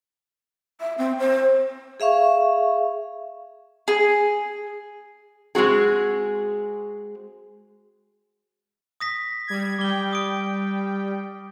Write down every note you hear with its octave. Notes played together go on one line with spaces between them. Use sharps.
E5
C4
C5
G#4 E5 F5 C#6
G#4
G#3 C4 F#4 G#4
D#6 A#6 B6
G3 G#6
G3 G5 D6 G7
D#6 D7